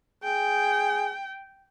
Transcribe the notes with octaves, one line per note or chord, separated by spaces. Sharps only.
G#4 G5